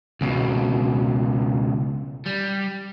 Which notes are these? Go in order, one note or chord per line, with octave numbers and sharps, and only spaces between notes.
C#2 B2
G3